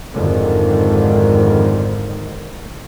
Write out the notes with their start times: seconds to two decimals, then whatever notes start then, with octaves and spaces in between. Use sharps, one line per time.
0.13 G#1 F2 G#2 D3 D#3